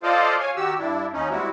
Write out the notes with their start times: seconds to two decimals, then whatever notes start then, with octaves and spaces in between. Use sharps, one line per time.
0.03 F4 A4 C5 D5 D#5 F5
0.39 C#5 F5 G#5
0.56 D#3 F#4 G4 E6
0.78 G2 D4 E4
1.13 D#2 C#4 D#4
1.30 G3 G#3 C4 E4 F#4